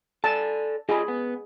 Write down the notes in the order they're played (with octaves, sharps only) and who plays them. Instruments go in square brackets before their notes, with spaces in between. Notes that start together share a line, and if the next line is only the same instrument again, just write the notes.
[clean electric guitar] A4 D5 G#5 [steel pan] A5
[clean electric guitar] F4 G4 D#5 [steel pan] G#4 B5
[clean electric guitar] B3